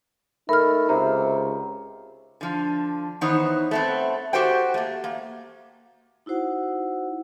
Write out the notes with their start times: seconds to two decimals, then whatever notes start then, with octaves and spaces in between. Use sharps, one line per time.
0.49 A3 D#4 A#4 B5 F6
0.89 C#2 C3 A#5
2.41 D3 F3
3.21 D#3 E3 B3 D#4 C5 C#5
3.71 A3 B3 C4
4.33 F#4 G4 A4 C5 F#5 G5
4.74 A3 A#3
5.04 A#3
6.26 D#4 E4 F#4 C5 F#5